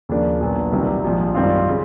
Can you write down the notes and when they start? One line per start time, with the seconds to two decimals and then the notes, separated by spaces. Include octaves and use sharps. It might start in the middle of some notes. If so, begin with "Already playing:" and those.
0.09 D#2 C#3 F3 A#3 D4
0.40 A#1 A#2 F#3 B3
0.72 C2 C3 D#3 F#3
1.04 A#1 G#2 F3
1.35 F#2 D#3 G3 C4 F4
1.69 C#3